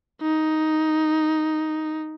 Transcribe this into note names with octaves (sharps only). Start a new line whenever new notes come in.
D#4